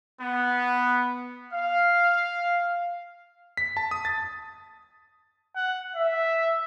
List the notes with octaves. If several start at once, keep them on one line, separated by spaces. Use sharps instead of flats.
B3
F5
B6
A5
D#6
A6
F#5
E5